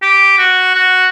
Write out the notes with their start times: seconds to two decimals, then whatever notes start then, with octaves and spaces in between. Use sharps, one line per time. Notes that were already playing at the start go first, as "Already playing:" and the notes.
0.02 G4
0.38 F#4
0.74 F#4